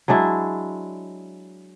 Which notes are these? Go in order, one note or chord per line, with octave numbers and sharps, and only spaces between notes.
F#3 G#3 D4 E4